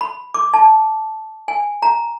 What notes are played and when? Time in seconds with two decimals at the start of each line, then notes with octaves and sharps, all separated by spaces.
0.01 B5
0.34 D6
0.54 A5
1.48 G#5
1.82 A#5